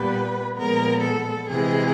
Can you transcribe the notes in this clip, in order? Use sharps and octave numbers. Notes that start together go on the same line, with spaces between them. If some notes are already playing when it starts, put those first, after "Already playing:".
Already playing: A#2 G3 B3 B4
A#2 F3 G#3 B3 A#4
A4
C3 E3 G#3 G#4